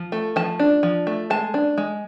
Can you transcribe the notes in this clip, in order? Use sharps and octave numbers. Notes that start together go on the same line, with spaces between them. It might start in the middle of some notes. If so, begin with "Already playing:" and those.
Already playing: F3
A3
F3 A5
D4
F3
A3
G#3 A5
D4
G#3